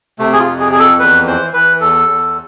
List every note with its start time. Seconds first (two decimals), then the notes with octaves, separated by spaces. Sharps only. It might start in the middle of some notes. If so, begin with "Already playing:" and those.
0.19 C3 A3
0.33 G#4
0.39 F4
0.45 F2
0.60 G#4
0.72 F2 G#4
0.79 A4
1.00 E2 B4
1.27 E3 C5
1.54 E3 B4
1.81 E2 A4
2.08 E2